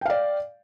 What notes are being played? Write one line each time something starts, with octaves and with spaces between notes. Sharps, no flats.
D5 F5 G5